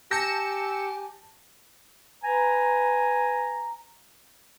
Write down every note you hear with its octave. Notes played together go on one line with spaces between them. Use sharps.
G4 G#5 A5 E6 G6 A#6 C#7 E7
B4 G#5 A#5